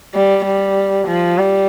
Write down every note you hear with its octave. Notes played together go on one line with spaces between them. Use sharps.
G3
G3
F3
G3